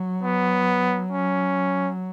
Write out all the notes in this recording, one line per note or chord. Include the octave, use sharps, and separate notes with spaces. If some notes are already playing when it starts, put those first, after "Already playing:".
Already playing: F#3
B3
C#4